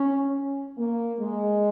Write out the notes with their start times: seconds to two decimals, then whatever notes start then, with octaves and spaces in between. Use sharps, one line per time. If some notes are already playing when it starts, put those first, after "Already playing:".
Already playing: C#4
0.77 A#3
1.20 G#3